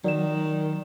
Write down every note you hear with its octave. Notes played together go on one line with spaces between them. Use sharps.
D#3 F#3 D5 E7